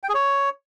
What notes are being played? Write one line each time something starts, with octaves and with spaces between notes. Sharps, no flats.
G5
G#4
C#5